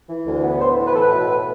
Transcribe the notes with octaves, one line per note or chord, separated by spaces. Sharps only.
E3
D2
B3
A2 C5
E3
B4
A2 A4
B4
B2
B3